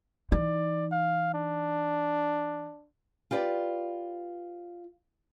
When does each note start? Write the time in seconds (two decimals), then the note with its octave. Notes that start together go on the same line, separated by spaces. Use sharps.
0.32 E3 D#4 D5
0.92 F5
1.34 D4
3.31 F4 G4 B4 D5